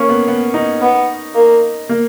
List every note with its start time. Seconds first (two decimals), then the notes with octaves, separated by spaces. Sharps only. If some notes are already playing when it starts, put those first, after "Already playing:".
Already playing: A#3 C#4
0.09 B3
0.28 B3
0.54 D#4
0.82 B3
1.35 A#3
1.89 A#3